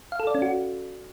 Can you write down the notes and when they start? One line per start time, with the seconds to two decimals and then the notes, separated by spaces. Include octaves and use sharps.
0.12 F5
0.20 A4
0.27 D5
0.35 C#4
0.42 F#4